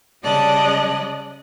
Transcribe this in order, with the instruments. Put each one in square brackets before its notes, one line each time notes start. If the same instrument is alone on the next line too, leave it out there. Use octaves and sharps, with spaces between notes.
[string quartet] C#3 G3 D5 D#5 A5 F#6